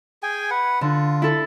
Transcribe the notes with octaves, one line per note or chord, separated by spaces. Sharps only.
G#4 G5 G#5
B4 F#5
D3 F4
E4 A4